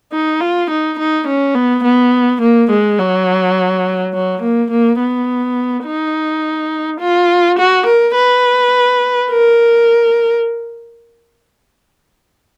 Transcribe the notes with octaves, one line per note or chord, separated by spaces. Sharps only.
D#4
F4
D#4
D#4
C#4
B3
B3
A#3
G#3
F#3
F#3
A#3
A#3
B3
D#4
F4
F#4
A#4
B4
A#4